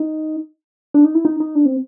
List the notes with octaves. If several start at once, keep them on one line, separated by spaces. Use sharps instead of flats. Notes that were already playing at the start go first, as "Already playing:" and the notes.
Already playing: D#4
D4
D#4
E4
D#4
D#4
D4
C4